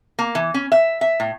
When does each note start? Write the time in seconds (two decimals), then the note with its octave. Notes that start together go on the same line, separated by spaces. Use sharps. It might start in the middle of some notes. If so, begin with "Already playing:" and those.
0.19 A#3
0.35 E3
0.54 C#4
0.72 E5
1.01 E5
1.20 A2